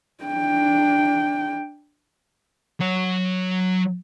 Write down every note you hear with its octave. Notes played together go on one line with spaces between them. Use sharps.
D4 G5
F#3 C#5